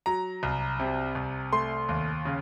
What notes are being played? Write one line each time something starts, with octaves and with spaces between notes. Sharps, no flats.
F#3 A#5
C2
C3
C2
A3 C6
D#2
C#3